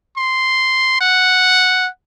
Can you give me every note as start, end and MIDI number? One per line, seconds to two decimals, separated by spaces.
0.17 1.00 84
1.01 1.88 78